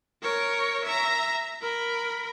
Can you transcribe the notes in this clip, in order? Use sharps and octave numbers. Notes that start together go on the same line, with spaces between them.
A#4 C#5
E5 A#5
A#4 B5